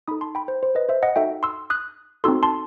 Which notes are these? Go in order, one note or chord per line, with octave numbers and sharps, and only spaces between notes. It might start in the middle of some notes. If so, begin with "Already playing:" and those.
D#4 A4 B5 D#6
A5 C6
G5 B5
C5
C5
B4 D#5
C5 E5
D#5 F#5
D#4 F#4 A4 E5 G5
C6 E6
D#6 F#6
C4 D#4 F#4 A4 C6 E6
A5 C6